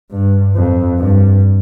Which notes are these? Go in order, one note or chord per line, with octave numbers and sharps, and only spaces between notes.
G2
F2
G2